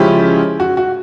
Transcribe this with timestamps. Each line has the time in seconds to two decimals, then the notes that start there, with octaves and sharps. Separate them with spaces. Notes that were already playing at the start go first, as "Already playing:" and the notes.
Already playing: C#3 F3 G#3 C#4 E4 G4
0.60 F#4
0.77 F#4